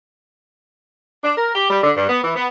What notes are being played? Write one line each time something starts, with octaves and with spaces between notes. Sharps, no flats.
D4
A#4
G4
G3
D3
G2
B3
E3
B3